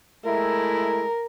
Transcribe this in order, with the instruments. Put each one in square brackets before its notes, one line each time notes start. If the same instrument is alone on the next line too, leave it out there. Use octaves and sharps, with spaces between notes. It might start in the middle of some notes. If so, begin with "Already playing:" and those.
[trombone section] G#3 A3 E4 [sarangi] A#4